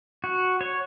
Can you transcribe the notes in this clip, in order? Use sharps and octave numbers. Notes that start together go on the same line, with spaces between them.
F#4
C#5